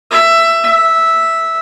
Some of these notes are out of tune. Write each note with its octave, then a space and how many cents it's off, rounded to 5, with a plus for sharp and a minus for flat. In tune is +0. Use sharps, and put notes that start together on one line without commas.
E5 +15
E5 -5